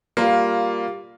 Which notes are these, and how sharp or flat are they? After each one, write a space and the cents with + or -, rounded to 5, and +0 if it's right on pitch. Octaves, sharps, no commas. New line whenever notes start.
G3 +5 A#3 +0 F4 +10